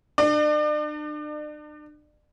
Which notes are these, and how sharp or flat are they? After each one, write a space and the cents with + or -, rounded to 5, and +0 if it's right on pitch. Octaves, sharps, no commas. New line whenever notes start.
D4 +40 D5 +40